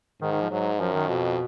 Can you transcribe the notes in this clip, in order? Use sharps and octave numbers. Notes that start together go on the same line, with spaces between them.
G#2 D#3
D#3
F3
G#2 F#3
F#2 F3
D#3
F2 B2